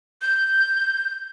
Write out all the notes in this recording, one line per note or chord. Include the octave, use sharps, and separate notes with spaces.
G6